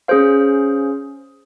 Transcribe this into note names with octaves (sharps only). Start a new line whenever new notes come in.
C#4 G#4 C5 F5